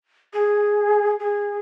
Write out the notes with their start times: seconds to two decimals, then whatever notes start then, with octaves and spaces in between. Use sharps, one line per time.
0.33 G#4
1.19 G#4